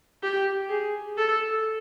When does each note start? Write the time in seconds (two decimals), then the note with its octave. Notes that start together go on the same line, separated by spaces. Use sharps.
0.23 G4
0.70 G#4
1.18 A4